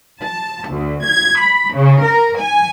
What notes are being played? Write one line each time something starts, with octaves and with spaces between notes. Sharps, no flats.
A5
D2
G#6
B5
C#3
A#4
G#5